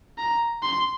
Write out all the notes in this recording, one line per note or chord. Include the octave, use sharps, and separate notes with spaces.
A#5
C6